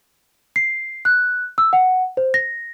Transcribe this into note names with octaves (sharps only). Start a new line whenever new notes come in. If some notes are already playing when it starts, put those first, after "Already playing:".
C7
F#6
E6
F#5
C5
A#6